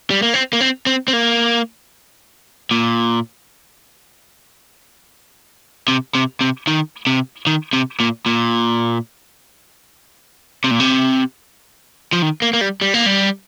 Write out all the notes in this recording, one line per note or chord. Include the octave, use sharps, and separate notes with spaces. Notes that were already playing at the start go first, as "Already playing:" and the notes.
G3
A#3
C4
A#3
C4
C4
C4
A#3
A#2
C3
C3
C3
D#3
C3
D#3
C3
A#2
A#2
C3
A#2
C3
F3
D#3
A#3
A#3
G3
G3
A#3
G3